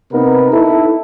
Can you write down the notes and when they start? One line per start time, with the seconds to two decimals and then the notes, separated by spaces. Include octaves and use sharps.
0.12 C3 B3 C4 D#4 A#4 B4
0.52 D#4 E4 A4